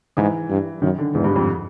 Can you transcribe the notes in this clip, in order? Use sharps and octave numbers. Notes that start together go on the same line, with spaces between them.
G#2 E3
G2
F#2 D#3
D3
E2 G#2
G2
F2